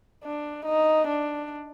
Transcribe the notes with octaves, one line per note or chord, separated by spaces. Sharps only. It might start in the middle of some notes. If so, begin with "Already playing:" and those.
D4
D#4
D4